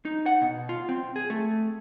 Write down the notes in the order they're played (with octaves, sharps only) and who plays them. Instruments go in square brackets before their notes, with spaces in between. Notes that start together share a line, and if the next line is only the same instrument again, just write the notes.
[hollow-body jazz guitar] D#4
F#5
B2
F4
C4
G#4
A3